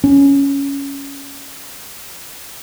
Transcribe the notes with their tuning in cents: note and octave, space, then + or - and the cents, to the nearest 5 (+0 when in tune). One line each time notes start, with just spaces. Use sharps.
C#4 +5